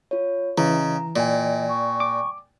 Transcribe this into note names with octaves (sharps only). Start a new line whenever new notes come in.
F4 C#5
C#3 E3 D#5 A#5
A#2 D5 D#5 G5 G#5
C#6
D6